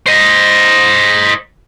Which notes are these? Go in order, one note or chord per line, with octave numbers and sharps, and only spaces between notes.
C5 D#5